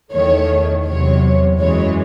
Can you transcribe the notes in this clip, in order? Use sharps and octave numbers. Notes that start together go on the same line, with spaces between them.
E2 D#3 A3 C#5
E2 C3 F#3 C#5
F#2 E3 G#3 C#5